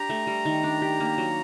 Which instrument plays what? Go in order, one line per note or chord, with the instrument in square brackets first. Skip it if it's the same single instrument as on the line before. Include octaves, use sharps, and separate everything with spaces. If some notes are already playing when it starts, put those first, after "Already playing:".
Already playing: [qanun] D4 G4 [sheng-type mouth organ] A#5
[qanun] A3
G3
D#3
D4
G4
A#3
F#3